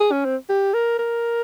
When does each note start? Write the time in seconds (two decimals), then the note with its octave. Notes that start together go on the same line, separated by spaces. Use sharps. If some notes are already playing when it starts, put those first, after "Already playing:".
0.01 G#4
0.12 C#4
0.25 C4
0.50 G4
0.74 A#4
0.99 A#4